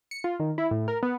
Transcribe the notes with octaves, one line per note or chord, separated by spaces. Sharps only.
C#7
F4
D#3
E4
A2
A#4
B3